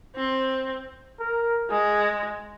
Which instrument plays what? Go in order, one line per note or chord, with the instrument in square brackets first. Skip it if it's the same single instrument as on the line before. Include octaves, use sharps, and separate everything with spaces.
[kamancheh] C4
[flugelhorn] A#4
[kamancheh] G#3 [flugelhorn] G#4